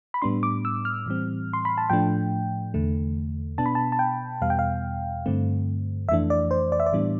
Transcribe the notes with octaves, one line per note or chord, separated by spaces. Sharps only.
B5
A2 G3 B3 D4 C6
D6
E6
F6
A2 E3 G3 C4
C6
B5
A5
A2 F3 A3 D4 G5
E2 D3 A3
B2 B3 D4 A5
B5
A5
A5
G5
E2 B2 G3 B3 F5
G5
F5
G2 D3 A3 C4
F2 E3 A3 D4 E5
D5
C5
D5
E5
D5
A2 E3 G3 B3 D4